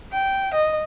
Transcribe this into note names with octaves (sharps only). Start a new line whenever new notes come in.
G5
D#5